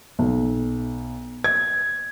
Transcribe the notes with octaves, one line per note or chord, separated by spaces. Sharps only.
B1
G#6